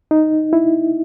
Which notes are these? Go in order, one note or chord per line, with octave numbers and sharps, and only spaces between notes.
D#4
E4